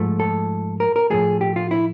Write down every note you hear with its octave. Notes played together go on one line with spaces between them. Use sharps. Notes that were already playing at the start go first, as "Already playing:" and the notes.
Already playing: G#2 F3 A3
A4
A#4
A#4
A2 F3 A3 G#4
G4
F4
E4